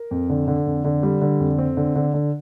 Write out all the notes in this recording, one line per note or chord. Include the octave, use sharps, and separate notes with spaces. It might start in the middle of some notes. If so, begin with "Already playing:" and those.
Already playing: A#4
F2
D3
D3
F2
D3
G3
D3
F2
C4
D3
D3
D3